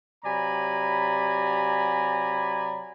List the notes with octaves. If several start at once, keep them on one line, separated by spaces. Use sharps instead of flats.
C3 F#3 D5 G#5 A#5 B5